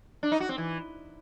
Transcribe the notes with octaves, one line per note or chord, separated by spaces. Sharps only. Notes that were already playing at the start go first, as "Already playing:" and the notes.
D4
D#4
F#4
C4
E3